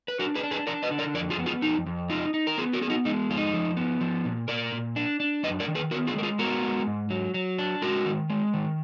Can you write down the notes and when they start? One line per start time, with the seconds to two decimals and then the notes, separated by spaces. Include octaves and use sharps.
0.08 B4
0.19 D4 F#4 A#4
0.35 G#4 B4
0.43 D4
0.51 G#4 B4
0.67 D4 A#4 D5
0.83 B4 D#5
0.91 D3
0.99 A#4 D5
1.14 F2 A#4 D5
1.30 F4 G#4
1.39 B3
1.46 F4 G#4
1.62 F2 D#4
1.86 F2
2.10 D#4 F4
2.34 D#4
2.47 A#4
2.58 B3 F4 G#4
2.73 F#4 A#4
2.81 B3 G#4
2.89 D#4 F#4
3.05 G#3 D#4
3.29 F2 F4
3.37 D#4
3.54 F3
3.77 B3
4.01 F3
4.25 A#2
4.48 A#2 A#4 D5
4.73 A#2
4.96 D4
5.20 D4
5.43 F#2 B4 D#5
5.60 A#4 D5
5.68 D#3
5.75 G#4 B4
5.91 B3 F#4 A#4
6.07 F4 G#4
6.16 G#3 A#4
6.23 F4 G#4
6.39 B3 F#4 A#4
6.63 G#3
6.87 G#2
7.10 F#3
7.34 F#3
7.58 D4
7.82 G#3 F#4 A#4
8.06 D#3
8.30 G#3
8.53 D#3